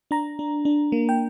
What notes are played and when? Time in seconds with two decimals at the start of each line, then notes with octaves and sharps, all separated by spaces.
0.11 D4 A#5
0.39 D4
0.65 D4
0.92 A#3
1.09 G5